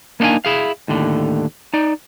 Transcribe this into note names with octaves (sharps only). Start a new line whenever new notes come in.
A#3 B3 D4 D#4 F5 G#5
E4 G#4 F5
D#2 A2 D3
D#4 D5